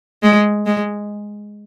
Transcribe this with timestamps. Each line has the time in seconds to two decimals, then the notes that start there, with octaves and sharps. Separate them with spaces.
0.23 G#3
0.66 G#3